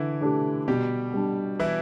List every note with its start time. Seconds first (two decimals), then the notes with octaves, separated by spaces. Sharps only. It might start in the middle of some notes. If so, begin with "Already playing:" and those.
Already playing: D3 E3 E4
0.21 A3 D4 G4
0.68 B2 G3 G4
1.14 G3 D4
1.60 E3 E4